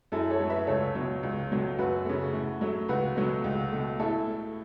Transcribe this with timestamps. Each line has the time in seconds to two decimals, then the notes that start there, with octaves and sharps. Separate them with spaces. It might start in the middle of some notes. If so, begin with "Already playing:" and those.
0.12 F#2 E4 A4
0.30 A4 C#5
0.40 F#3 A3
0.49 B4 E5
0.67 C#2 A4 C#5
0.95 B2 F#3
1.23 C#2
1.51 B2 F#3 A3
1.78 F#2 F#4 B4
2.05 C#3 A3
2.33 A2
2.61 F#3 A3
2.89 C#2 F#4 B4
3.16 B2 F#3 A3
3.44 C#2
3.72 B2 A3
3.99 A2 E4 A4
4.27 A3